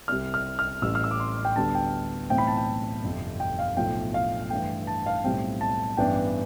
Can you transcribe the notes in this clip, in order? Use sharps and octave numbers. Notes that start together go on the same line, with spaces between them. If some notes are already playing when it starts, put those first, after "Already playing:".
C2 C3 G3 F6
F6
F6
A1 A2 G3 E6
F6
E6
D6
C6
G5
D2 D3 G3 B3 D4 A5
G5
B1 A2 E3 A3 C4 G5
B5
A5
G5
G1 F2 C3
G5
F5
B1 A2 F3 A3 G5
F5
G2 E3 A3 G5
A5
F5
B1 A2 G3 C4 G5
A5
A1 G2 E3 B3 D4 G5